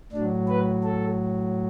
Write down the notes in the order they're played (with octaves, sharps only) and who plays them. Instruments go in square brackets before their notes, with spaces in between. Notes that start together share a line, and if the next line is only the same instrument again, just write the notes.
[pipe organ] A2 F#3 D4
B4
A4